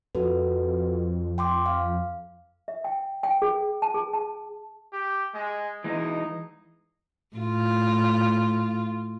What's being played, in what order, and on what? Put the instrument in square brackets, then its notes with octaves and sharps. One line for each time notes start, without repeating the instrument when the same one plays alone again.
[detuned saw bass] F2 [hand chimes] F#4 A4 B4
[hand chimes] G5 C6 D6
F5
[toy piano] E5
G5
G5
G#4
A5
G#4
A5
[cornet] G4
G#3
[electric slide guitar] E3 G#3 [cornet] D#4
[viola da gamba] A2 F4